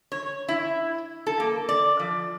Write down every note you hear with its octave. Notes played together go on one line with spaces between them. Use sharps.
C#5
E4
A4
A#3
D5
F3